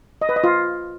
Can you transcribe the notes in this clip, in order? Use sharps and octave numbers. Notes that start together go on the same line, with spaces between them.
D#5
B4
D#5
F4